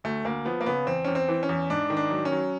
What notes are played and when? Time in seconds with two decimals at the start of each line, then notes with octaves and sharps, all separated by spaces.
0.04 D2 A3
0.24 D2 A#3
0.45 F3 B3
0.61 A#3
0.66 C#3 B3
0.86 E2 C4
1.05 E2 C#4
1.15 C4
1.28 E3
1.43 C#4
1.49 E2
1.70 G#2 D4
1.90 D#3
1.97 D4
2.10 F#3
2.25 C#4
2.32 F#3